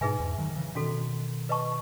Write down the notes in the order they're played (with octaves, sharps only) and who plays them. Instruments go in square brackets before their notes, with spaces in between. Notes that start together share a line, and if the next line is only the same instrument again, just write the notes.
[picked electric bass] G#2 B2 [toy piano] D#4 G#4 B4 E5 G#5
[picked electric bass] E2 G#2
D#3 F#3
D#3
C#3 E3
[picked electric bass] B2 D#3 [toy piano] C#4 F#4 A4
[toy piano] B4 D#5 A5 C#6